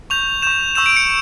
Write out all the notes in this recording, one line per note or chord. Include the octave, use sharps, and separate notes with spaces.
C#6 G6 F7
C#6 G6 E7
C#6 E6 G6 E7
D7
C#7